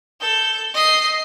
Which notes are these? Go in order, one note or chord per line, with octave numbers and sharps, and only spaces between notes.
A4 G6
D#5 C7